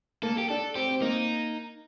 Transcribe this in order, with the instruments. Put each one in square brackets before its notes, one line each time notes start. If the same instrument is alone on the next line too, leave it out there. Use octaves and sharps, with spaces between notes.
[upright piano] A#3 [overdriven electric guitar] A4
[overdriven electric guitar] G4
[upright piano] D4 [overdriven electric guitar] A4
[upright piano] C4 [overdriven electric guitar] G4
[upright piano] C4
[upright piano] A#3 [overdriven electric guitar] D#4